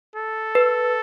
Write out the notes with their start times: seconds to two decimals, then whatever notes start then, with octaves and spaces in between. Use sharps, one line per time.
0.16 A4
0.55 B4